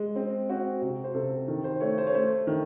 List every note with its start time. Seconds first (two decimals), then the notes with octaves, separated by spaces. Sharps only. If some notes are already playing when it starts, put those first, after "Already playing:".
Already playing: G#3
0.16 C4
0.49 C4 F#4
0.82 C3 F#4
1.04 C5
1.14 C3 A4
1.48 D#3 A4
1.64 C5
1.80 A3 C#5
1.98 C5
2.07 C#5
2.14 A3 C5
2.47 D#3